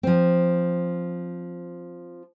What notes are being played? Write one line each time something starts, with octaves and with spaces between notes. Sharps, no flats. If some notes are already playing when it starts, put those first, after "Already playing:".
F3 C4